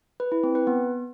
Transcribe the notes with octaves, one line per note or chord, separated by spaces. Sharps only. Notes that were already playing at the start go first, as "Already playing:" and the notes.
B4
E4
C4
B4
B3